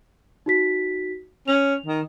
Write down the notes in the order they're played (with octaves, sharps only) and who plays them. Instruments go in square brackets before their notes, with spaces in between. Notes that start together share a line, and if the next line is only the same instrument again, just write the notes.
[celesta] D#4 F#4 B6
[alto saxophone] C#4 [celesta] F7
[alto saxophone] D#3